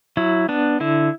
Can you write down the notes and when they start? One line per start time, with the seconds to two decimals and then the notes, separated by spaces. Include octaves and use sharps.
0.17 F#3 E4
0.49 B3 D4
0.80 D3 E4